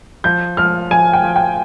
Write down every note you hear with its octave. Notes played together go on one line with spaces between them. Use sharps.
F3 G6
F3 F6
F3 G#5
G5
F3
G5